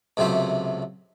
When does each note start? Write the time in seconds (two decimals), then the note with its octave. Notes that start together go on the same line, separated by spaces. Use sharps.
0.17 C#2 F#2 C3 A3 C5 E5